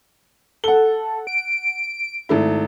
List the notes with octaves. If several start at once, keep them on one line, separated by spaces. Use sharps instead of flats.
A4 F#5 G7
D7
G#1 A3 E4